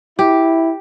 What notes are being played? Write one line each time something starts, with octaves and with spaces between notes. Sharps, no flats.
E4 G4